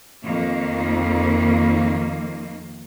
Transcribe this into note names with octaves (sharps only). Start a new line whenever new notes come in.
F2 D#3 A#3